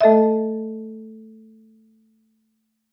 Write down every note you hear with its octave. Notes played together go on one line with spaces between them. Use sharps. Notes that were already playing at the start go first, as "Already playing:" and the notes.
A3 A4 D#5 E5